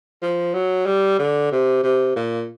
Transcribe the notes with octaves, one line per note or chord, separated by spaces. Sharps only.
F3
F#3
G3
D3
C3
C3
A#2